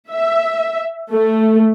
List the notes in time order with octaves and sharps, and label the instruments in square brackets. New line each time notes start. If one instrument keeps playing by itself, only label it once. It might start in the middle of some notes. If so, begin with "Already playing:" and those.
[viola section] E5
A3